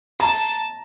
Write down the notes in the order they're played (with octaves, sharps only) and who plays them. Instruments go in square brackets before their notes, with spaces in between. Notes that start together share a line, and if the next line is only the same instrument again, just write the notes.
[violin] A5 [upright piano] A#5